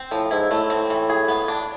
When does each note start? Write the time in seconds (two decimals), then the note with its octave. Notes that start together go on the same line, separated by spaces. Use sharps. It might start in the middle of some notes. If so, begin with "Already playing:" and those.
Already playing: C4
0.11 A2 F3
0.31 G#2 E4
0.51 A2 A3
0.70 C4
0.90 E3
1.10 G#4
1.28 B3
1.48 D4